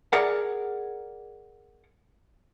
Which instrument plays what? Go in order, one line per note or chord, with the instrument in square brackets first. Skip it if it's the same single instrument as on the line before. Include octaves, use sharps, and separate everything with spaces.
[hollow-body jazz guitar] G#4 A#4 D5 F#5